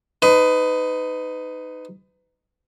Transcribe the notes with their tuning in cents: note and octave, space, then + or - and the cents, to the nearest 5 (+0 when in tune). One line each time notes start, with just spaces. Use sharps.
D#4 +0 B4 +30